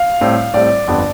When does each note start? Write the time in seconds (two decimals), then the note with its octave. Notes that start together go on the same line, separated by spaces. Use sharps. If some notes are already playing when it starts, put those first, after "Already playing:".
Already playing: F5
0.21 A2 G3 C4
0.54 A2 G3 C4 D5
0.87 G1 F2 D3 G3 B3